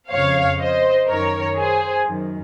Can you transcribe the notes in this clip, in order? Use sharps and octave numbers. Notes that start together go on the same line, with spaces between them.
F2 C#3 C#5 F5
C5 D#5
F#2 D#3 A#4 C#5
G#4 C5
F#2 D#3